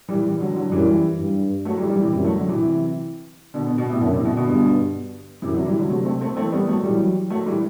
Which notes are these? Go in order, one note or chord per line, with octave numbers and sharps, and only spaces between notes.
E3 G3
E3 G3
D3 F#3
D3 F#3
F#2 E3 G3
G2
F#3 A3
E3 G3
E3 G3
C3 E3
F#2 E3 G3
F#3 A3
D3 F#3
C3 E3
B2 D3
B2
B2
A2 C3
F#2 B2 D3
A2 C3
B2
B2 D3
G2
F#2 C3 E3
D3 F#3
E3 G3
D3 F#3
C3 F#3 A3
A3 C4
A3 C4
E3 A3 C4
G3 B3
F#3 A3
E3 F#3 G3
F#3 A3
E3 G3